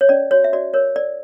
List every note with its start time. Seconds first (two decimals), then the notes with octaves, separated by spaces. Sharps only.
0.01 C#5
0.09 C#4 D5
0.31 F#4 C#5
0.44 E5
0.53 F#4 D5
0.74 A#4 C#5
0.96 A#4 D5